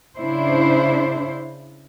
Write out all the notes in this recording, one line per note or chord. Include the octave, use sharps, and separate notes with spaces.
C#3 D4 E4 C5